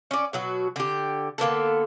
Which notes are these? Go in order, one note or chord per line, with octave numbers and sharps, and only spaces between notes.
C#4 D5
B2 F#3 F#4
D3 G4
D3 A#3 B3 A4